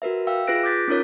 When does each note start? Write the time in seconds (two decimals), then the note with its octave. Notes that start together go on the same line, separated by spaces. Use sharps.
0.02 F#4 A#4 B4 E5
0.27 E5 F5 G5 E6
0.47 F4 G#4 B4 F#6 A#6 D7
0.63 D6 F#6 G6 A6 B6
0.88 C#4 D#4 F4 A#4 C#5